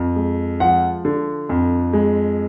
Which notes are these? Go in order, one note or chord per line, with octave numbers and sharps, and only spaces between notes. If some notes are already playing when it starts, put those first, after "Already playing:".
Already playing: F2
G#3
F3 F#5
D3
F2
G#3